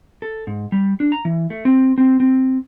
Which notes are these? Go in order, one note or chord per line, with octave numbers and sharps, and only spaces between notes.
A4
G#2
G3
D4
A#5
E3
A3
C4
C4
C4